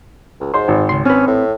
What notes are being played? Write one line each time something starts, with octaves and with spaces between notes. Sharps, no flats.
C#2
G#2 C5 C6
G#1
C#2 C6
C4 C#4 B4
A2